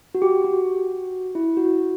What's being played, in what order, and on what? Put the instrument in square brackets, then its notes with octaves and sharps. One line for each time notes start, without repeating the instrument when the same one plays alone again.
[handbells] F#4
G4
F#4
E4
F#4